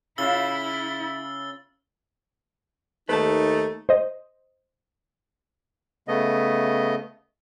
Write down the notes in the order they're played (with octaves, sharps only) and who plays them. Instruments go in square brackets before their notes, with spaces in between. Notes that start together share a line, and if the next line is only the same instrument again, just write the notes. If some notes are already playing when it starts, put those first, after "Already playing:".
[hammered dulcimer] C#3 F4 E5 [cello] E4 [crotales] E6 A6 G7
[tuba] D#2 [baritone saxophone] A3 [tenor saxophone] D#4 [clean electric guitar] B4 C5 A5
[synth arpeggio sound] C5 D#5
[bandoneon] C#3 A3 B3 D#5